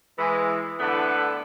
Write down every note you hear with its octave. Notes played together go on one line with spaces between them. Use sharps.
E3 G#3
A2 D3 B3 E4 A4 B4